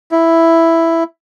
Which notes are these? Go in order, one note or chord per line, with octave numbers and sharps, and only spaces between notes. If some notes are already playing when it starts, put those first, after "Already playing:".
E4